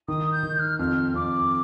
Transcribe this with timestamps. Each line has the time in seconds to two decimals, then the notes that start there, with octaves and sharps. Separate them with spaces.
0.08 D#3 D#6
0.32 G6
0.43 D#3
0.55 G6
0.59 F6
0.79 F2 F6
1.14 F2 D6